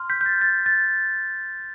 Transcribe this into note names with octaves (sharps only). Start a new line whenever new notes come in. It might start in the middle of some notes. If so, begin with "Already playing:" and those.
Already playing: C6 F6
G6 B6
G6
A6
A6
A6